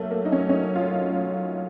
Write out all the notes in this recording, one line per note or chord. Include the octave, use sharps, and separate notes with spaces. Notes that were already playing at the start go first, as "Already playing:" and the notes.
Already playing: F#3 A3 A#3
A#3
D#4
C#4
C#4
D#4
F4